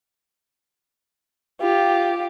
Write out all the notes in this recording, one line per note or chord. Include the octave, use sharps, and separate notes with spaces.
F4 G4